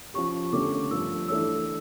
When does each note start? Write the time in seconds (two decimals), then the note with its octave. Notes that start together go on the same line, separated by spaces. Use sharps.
0.14 F3 C#4 G4 C#6
0.52 D3 A3 C#4 G4 D6
0.91 G2 F3 A3 E6
1.28 E3 A3 D4 A4 C#5 E6